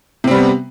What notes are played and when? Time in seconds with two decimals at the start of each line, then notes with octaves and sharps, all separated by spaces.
0.24 C3
0.28 C4
0.31 G3
0.35 B3